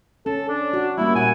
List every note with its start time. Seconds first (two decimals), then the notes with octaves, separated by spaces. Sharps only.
0.26 C#4 A4
0.49 D4
0.73 F#4
0.98 G3 A#3 C#4 E4
1.15 A#2 F#5 G#5